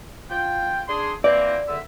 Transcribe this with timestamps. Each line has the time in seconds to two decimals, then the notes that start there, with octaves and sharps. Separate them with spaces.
0.31 F4 G5
0.88 D4 G#4 C6
1.24 E3 A#3 C4 D5
1.68 C#2 D3 E5